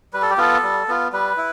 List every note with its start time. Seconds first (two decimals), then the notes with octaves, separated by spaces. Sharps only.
0.13 G3 B4
0.22 A4
0.30 G4
0.38 B3 F4 A4
0.63 G3
0.88 B3 F4
1.13 G3 B4
1.37 E4